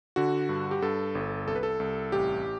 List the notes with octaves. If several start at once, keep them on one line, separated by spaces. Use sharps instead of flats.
D3 F#4
G2
G4
G2 A4
G1
C2 A4
B4
A4
C2
A1 G4